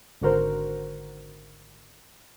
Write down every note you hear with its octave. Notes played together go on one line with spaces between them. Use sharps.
G#1 D3 F#4 A#4 C5